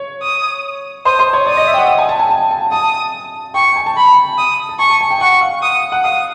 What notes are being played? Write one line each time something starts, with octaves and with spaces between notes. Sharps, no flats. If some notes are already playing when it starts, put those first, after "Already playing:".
Already playing: C#5
D#6
C5 D#6
C5
C#5
D5 D#6
D#5
E5
G5
F#5
G5
G#5
A5
G#5
A5
A5
A5 D#6
G5 C#6
G5
G#5
A5
A5 B5
D#6
A5
G#5 C#6
A5
G#5
G5
F#5 C#6
F5
D#6
F#5
F5 D#6